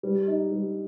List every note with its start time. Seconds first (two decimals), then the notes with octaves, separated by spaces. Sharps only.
0.03 G3
0.27 D#4
0.52 G3